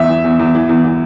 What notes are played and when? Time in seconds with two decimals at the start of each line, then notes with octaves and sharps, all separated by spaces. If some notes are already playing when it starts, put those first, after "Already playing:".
Already playing: E2 E5
0.09 E3
0.24 E2
0.39 E2
0.55 E3
0.69 E2
0.84 E3